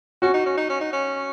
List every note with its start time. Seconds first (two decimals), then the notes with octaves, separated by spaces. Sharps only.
0.22 C#4 F#4
0.34 D#4
0.46 C#4
0.57 D#4
0.69 C#4
0.81 D#4
0.93 C#4